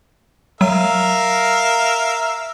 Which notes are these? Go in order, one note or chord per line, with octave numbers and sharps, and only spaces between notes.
F#3 A#4 E5 F5